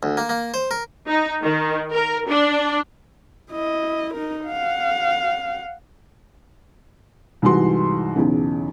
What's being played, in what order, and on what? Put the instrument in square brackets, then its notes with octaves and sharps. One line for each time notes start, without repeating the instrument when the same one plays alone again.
[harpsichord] D2
A#3
A#3
C5
A#4
[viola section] D#4
D#3
A#4
D4
[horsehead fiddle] E4 D#5
D#4 A#4
F5 F#5
[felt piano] C2 G#2 E3 F#4 C6
B1 E2 C#3